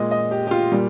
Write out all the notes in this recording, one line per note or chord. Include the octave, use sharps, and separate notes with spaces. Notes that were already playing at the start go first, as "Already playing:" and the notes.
Already playing: A#2 G#3 D#5
D#5
G4
G4
F4
A#2 G3